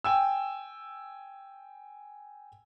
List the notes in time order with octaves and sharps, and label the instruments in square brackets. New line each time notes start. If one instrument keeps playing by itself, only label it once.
[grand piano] G5 G#5 E6